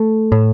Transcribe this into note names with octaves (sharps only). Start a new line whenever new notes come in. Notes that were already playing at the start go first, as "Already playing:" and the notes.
Already playing: A3
A2